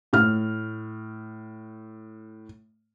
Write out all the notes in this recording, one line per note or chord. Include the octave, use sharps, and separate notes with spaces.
A2 F6